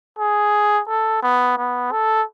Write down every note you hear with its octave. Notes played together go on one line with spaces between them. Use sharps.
G#4
A4
B3
B3
A4